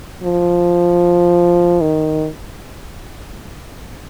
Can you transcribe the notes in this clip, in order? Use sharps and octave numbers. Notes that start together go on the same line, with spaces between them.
F3
D#3